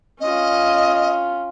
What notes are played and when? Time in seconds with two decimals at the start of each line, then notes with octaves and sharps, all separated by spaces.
0.21 C#4 F4 D#5